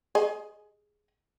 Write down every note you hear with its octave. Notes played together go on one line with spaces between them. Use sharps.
G#4 D#5